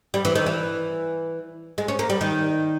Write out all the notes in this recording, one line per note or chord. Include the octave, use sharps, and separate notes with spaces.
G3
E3
D#3
E3
G#3
C#4
A#3
G3
D#3